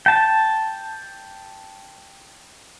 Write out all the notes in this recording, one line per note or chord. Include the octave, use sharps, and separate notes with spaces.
G5 A5